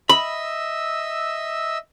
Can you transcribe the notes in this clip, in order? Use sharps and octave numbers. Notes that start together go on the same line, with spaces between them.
D#5 E5 B5 E6